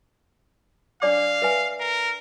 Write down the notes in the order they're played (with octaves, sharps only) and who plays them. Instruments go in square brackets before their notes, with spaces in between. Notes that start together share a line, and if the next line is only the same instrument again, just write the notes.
[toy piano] D4 D5 D6 [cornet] F5
[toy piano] B4 E5 G#5
[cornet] A#4